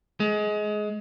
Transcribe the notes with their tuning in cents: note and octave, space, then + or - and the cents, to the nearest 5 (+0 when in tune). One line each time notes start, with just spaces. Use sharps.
G#3 +20